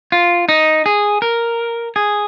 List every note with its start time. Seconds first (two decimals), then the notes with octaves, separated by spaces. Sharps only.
0.12 F4
0.49 D#4
0.86 G#4
1.22 A#4
1.96 G#4